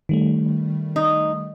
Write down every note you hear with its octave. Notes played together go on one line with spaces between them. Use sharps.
D#3 G3 A3
D#4